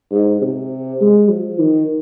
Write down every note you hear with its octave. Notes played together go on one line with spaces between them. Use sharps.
G#2
C3
G#3
F3
D#3